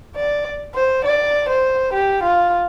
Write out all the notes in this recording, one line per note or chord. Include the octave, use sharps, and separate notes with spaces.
D5
C5
D5
C5
G4
F4